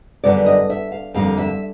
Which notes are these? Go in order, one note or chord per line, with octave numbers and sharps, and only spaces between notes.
F#2 D3 G3 B3 D5
D#5
E5
F5
F2 D3 G3 A#3 F5
E5